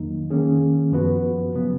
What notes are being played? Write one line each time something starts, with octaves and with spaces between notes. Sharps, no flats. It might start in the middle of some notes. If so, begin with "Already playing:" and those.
Already playing: F2 D#3 F#3 A#3 D#4
D#3 A#3 C#4 G#4
F#2 F3 B3 F#4 B4
C#3 F#3 B3